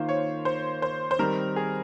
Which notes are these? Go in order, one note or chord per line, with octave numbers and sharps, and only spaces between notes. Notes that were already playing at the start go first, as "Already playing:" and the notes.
Already playing: D#3 A#3 F4 C5
C#5
C5
C5
C5
D#3 G3 C4 D#4 A#4
G#4